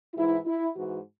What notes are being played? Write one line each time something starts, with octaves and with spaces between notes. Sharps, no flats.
G#2 E3 E4
E4
G#2 E3 F#4